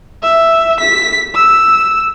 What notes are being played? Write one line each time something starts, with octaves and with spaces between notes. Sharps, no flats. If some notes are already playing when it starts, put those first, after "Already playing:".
E5
B6
E6